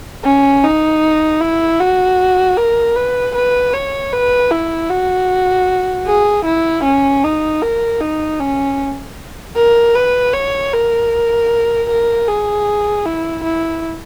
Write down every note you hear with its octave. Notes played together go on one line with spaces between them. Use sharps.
C#4
D#4
E4
F#4
A#4
B4
B4
C#5
B4
E4
F#4
G#4
E4
C#4
D#4
A#4
D#4
C#4
A#4
B4
C#5
A#4
A#4
G#4
E4
E4